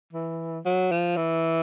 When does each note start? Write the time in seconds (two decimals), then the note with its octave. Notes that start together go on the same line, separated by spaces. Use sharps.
0.13 E3
0.65 F#3
0.91 F3
1.16 E3